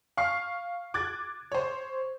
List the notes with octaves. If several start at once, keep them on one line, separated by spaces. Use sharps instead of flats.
F5 C#6 F6 C7
D6 F#6 G#6 A6
C5 C#5